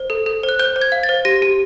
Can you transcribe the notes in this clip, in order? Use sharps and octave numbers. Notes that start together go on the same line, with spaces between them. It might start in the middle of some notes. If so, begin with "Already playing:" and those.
Already playing: C5
A4
A4
C5
F#6
C5 G6
C5
G#6
F5
A6
C5
G4 A#6
G4